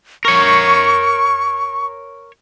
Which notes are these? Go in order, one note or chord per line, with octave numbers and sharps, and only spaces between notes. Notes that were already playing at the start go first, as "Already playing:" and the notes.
A#4 C#5 C#6